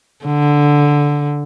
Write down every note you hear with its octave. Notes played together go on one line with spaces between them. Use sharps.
D3